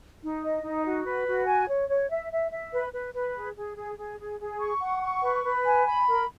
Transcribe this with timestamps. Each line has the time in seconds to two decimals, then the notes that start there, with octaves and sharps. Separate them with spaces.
0.22 D#4
0.43 D#5
0.64 D#4
0.84 F#4
1.05 B4
1.27 F#4
1.47 G#5
1.68 C#5
1.89 C#5
2.10 E5
2.31 E5
2.51 E5
2.72 B4
2.93 B4
3.14 B4
3.35 G#4
3.55 G#4
3.77 G#4
3.97 G#4
4.19 G#4
4.40 G#4
4.60 C#6
4.81 F#5
5.02 C#6
5.23 B4
5.44 B4
5.64 G#5
5.85 B5
6.07 A#4